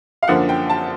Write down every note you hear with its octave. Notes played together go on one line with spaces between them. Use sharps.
F5
F#2 D3 F3 A#3 F#5
G5
A5